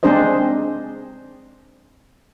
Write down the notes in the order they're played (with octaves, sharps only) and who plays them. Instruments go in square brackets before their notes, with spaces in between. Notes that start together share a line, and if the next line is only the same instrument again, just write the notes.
[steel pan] G#3 C4 D4 G#4 C5 D#5